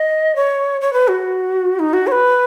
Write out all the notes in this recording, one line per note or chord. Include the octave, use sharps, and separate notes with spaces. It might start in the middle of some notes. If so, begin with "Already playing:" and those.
Already playing: D#5
C#5
C#5
B4
F#4
D#4
F#4
C#5
B4